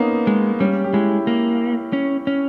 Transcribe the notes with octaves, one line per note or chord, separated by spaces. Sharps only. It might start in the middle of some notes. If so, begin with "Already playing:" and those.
Already playing: A#3 B3 C#4 D#4
G#3
G3 C#4
G4
G#3 E4
A#3
C#4
C#4